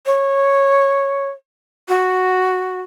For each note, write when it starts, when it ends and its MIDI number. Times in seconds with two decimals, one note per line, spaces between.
0.06 1.29 73
1.88 2.81 66